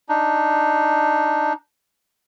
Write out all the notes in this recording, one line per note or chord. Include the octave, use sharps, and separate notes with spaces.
D4 D#4